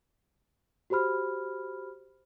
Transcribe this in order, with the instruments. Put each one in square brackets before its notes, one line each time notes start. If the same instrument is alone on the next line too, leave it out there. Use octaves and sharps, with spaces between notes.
[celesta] F#4 G4 C5 B5 F6